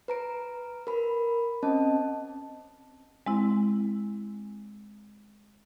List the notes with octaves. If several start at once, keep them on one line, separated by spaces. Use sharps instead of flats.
B4 A#5 D7
A#4 B5
C4 C#4 D#5 A5
G#3 C4 E4